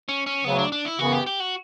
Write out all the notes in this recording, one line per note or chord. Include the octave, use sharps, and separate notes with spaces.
C#4
C#4
D2 C#3 F#3 B3
D4
D4
E4
F#2 C#3 E3 B3 F#4
G4
G4
F#4